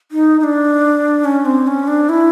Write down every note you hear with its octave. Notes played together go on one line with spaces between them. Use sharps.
D#4
D#4
D4
C#4
C4
C#4
D4
E4